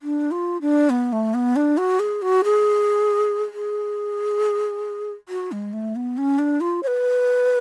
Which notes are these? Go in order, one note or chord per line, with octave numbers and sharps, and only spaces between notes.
D4
F4
D4
B3
A3
B3
D4
F#4
G#4
F#4
G#4
G#4
F#4
G#3
A3
B3
C#4
D4
F4
C#5
B4